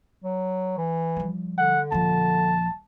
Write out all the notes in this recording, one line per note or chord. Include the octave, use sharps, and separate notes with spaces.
F#3
E3
F3 G3
D3 F#5
D#1 F3 A5